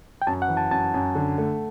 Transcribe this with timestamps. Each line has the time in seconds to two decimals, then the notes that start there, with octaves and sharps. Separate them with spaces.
0.22 G5
0.27 F#2 A5
0.42 F#5
0.48 E3
0.57 A5
0.71 F#2 A5
0.94 F#2
1.15 D3
1.38 A3